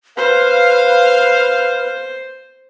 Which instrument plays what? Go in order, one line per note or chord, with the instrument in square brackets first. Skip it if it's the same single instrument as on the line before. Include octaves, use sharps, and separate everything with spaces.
[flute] B4 [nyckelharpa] C5 [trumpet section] F5